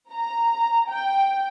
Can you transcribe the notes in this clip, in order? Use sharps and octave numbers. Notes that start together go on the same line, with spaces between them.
A#5
G5